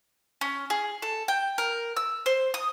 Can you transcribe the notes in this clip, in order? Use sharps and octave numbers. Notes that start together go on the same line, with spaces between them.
C#4
G#4
A4
G5
A#4
E6
C5
D#6